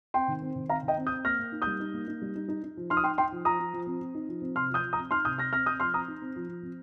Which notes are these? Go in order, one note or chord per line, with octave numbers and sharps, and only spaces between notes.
C4 G5 C6
D#3
C4
D#3
C4 F5 A#5
D#3
D#5 G5
C4
D#6 G6
C4
A#3 F6 A#6
A#3
D#4
G3 D#6 G6
D#4
A#3
D#4
G3
D#4
D#4
D#4
F3
D#4 C6 F6
D#6
D#4 G5 C6
D#4 G5 C6
F3
F3 A#5 D#6
F3
F3
C4
C4
D#4
F3
C4
C3 C6 F6
F3
D#6 G6
F3
A#5 D#6
C4
D#4 C6 F6
C3 D#6 G6
C4 F6 A#6
C4 F6 A#6
C4 D#6 G6
F3 C6 F6
C4 A#5 D#6
D#4
C4
F3
F3
C4